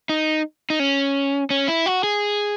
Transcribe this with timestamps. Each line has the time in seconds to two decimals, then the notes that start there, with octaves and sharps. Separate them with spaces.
0.09 D#4
0.70 D#4
0.80 C#4
1.50 C#4
1.68 E4
1.86 F#4
2.04 G#4